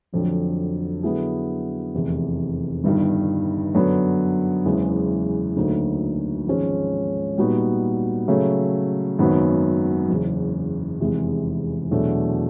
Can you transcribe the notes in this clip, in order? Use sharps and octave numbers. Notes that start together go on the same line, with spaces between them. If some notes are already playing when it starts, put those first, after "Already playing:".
F1 F2 D3 F#3
D3 F#3 B3 E4 G#4
F1 E2 C3
G1 G2 D#3
F#2 D3 F#3 B3
F#1 E2 C#3 E3 G#3
D2 D3 F#3 A#3 D#4
G#1 G#2 F3 G#3 C#4
A#2 G3 B3 D#4 F#4
C#3 F#3 A3
G#1 F#2 D#3 F#3 B3
F#1 E2 C#3
F1 E2 C3 E3 G#3
E2 B2 F#3 A3 D4